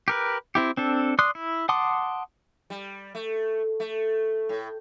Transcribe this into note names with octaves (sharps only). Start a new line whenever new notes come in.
G4 A#4 B4
C4 E4 G4
C4 D4 A4
D5 C6 D#6 F#6
E4
F#5 A5 C6 D6 D#6
G3
A3
A3
A2